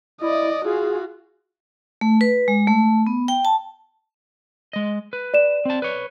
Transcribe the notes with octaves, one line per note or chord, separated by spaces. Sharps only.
E4 D5 D#5
F4 F#4 G#4
A3
B4
G#3
A3
B3
G5
A5
G#3 D#5
B4
D5 E7
C4 A5
B4 C#5